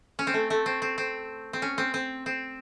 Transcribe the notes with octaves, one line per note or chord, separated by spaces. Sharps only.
C#4
C4
A3
A3
C4
C4
C4
C4
C#4
C4
C4
C4